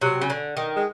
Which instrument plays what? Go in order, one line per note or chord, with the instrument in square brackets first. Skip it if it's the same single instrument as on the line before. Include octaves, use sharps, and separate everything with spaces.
[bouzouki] C3 [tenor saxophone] F#3
[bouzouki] C#3
D3
D#3
[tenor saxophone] G#3